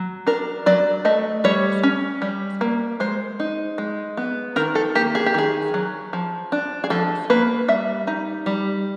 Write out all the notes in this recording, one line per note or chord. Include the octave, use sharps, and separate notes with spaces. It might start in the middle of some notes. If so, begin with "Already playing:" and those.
Already playing: F#3
D4 A#4
F#3 D5
A3 D#5
G3 C#5
C#4
G3
A#3
G#3 C5
D#4
G#3
B3
D#3 A#4
A4
A#3 G4
G#4
G4
D#3 G#4
F#3
F3
D4
G#4
F3 A4
A#3 B4
G3 E5
D#4
G3